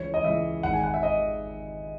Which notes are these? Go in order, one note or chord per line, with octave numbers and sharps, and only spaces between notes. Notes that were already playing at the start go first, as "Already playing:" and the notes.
Already playing: C#2 C#3 E3 C#5
D#5
C#2 C#3 E3 E5
G#1 G#2 D#3 F#5
G#5
F#5
E5
D#5